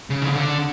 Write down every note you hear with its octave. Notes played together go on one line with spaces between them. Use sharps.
C#3
D#3
D3